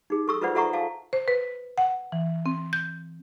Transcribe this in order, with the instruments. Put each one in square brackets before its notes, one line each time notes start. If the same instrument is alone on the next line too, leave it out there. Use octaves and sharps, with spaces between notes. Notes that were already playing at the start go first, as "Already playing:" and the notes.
[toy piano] D#4 G#4
A4 C#6 E6
E4 F4 B4 C5 D5 F#5
F4 A4 E5 F#5 A#5 C#6
F5 A5
[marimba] C5
B4
F#5
E3
C4
G6